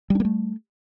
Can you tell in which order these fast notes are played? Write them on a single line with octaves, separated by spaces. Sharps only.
G3 D4 A#3 A3